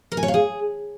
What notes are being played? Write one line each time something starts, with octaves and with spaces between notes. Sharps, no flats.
A#4
G#5
C#5
F5
G#4